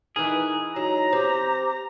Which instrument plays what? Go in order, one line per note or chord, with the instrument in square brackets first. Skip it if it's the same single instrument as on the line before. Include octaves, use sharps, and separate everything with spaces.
[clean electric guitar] E3 G#4 [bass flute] D#4 [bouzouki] A#4 B4
[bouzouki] F#3 [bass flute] D#4 [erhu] A#5
[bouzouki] C4 [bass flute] G4